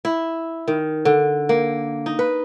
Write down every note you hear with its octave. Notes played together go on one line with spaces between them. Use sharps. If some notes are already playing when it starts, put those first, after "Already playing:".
E4
D#3
D3
A#3
D#4
B4